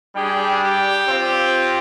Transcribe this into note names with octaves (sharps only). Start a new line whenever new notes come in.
G3 D4 G4 G#4
G4
C4 F4